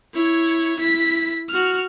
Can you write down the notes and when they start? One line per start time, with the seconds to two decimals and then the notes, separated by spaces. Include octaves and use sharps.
0.14 E4 C#5
0.76 E4 B6
1.49 F#4 F6